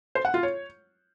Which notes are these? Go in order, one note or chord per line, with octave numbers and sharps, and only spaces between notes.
C5
F#5
F4
C#5